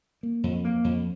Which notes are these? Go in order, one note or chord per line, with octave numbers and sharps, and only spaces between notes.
A#3
F2
A#3
F2